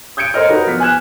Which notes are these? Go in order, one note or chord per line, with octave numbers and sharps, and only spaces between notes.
D#6 G6 G#6 C#7 D7
A#4 C5 C#5 D#5 F6
D#4 F#4 G4 A#4 B4
F3 B3 B6
G#5 F#6 G#6 E7